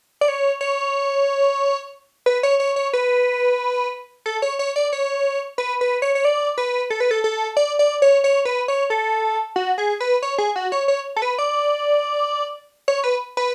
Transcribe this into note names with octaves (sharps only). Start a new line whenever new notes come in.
D5
C#5
C#5
B4
C#5
C#5
C#5
B4
A4
C#5
C#5
D5
C#5
B4
B4
C#5
C#5
D5
B4
A4
B4
A4
A4
D5
D5
C#5
C#5
B4
C#5
A4
F#4
G#4
B4
C#5
G#4
F#4
C#5
C#5
A4
B4
D5
C#5
B4
B4